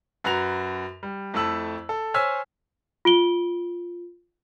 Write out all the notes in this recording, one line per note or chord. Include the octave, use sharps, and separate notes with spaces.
F#2 F#4 B4 A#5 F7
G3
F2 A3 E4 A5 E6 F#7
A4
C5 C#5 G#5 E6 F6 B6
F4 D7 G7